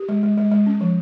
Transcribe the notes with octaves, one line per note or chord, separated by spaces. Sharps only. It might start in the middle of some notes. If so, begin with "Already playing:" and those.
Already playing: G4
G#3
G#3
G#3
G#3
C#4
F3